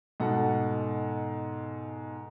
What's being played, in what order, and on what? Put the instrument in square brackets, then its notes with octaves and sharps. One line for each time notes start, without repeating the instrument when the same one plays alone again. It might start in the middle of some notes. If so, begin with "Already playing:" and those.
[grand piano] G#2 B2 A4 F#5